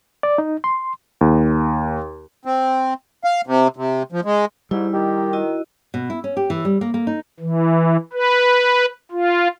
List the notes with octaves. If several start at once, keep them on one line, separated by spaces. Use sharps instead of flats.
D5
D#4
C6
D#2
C4
F5
C3
C3
F3
G#3
G#2 G3 E4
D#3 G4
E4 F#4 D#5
B2
E4
C#4
G4
E3
G3
A#3
A#3
D#4
E3
B4
F4